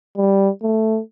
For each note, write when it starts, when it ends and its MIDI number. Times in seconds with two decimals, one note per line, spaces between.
0.17 0.49 55
0.63 0.99 57